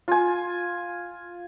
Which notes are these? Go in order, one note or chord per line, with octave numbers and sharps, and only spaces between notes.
F4 G#5